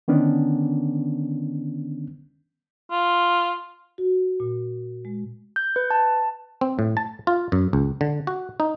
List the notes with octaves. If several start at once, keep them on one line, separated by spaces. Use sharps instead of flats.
D3 D#3 B3 C#4 D4
F4
F#4
A#2
G#3
G6
B4
A5
C4
A2
A5
F4
F#2
C#2
D3
F#4
D#4